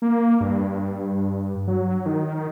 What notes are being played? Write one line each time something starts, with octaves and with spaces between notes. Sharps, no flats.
A#3
G2
F#3
D#3